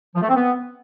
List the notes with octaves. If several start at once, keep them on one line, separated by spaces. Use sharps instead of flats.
F3
A3
C4
B3